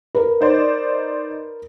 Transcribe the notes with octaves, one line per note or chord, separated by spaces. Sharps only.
A#4 B4
D#4 C5 D5